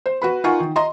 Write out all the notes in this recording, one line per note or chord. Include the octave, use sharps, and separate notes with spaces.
C5
F#4 B4 B5
D#4 F4 A#4 F#5 G#5 C#6
D#3
D#5 A#5 C6